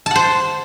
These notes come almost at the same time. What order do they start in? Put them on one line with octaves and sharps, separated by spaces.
A5 F#5 C5